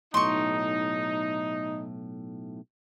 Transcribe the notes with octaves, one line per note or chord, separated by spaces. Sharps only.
B1 A2 D#4 C6 C#6